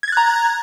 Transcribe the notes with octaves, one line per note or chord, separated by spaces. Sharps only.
A#5 F#6 G#6 A6